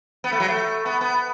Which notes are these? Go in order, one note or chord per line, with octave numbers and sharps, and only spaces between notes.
B3
A3
F#3
A3
B3
B3